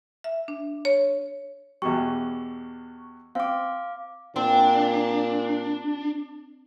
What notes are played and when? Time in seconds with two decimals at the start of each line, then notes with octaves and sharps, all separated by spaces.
0.24 E5
0.48 D4
0.85 C#5
1.82 E2 B2 G3 C#6
3.35 C4 F5 D6
4.36 A#2 C4 D4